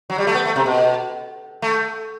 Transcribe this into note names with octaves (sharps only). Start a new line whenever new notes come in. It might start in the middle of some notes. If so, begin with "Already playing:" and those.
F#3
G3
A3
B3
A3
C3
B2
A3